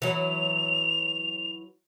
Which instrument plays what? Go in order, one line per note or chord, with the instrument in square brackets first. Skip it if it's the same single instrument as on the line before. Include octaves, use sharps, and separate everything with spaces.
[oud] E3 F#3 [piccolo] F7